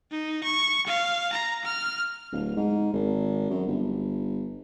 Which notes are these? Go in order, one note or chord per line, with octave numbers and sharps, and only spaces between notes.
D#4
C#6
F5
A#5
F6
D1
G#2
G#1
F#2
G1